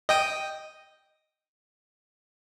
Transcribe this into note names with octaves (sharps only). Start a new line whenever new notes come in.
D#5 G5 D#6